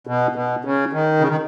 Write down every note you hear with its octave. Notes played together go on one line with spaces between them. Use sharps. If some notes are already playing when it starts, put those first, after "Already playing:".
B2
B2
C#3
D#3
C#3
D#3